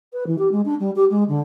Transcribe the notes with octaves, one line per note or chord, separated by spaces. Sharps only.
B4
E3
G4
G#3
D4
G3
G4
G#3
D3